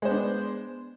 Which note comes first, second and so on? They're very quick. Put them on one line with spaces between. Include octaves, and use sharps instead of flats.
G#3 C5 B3 D4